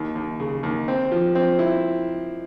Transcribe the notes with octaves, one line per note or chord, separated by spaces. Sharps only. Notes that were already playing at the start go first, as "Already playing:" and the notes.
Already playing: D#2
D#2
C#3
D#2
C4
F3
C4
E4